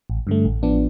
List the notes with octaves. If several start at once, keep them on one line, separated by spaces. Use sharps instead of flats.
A1
G2 D3 A3
A1
F3 B3 D4